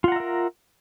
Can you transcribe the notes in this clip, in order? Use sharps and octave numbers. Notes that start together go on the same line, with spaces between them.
F4 A#4 E5 F#5 A#5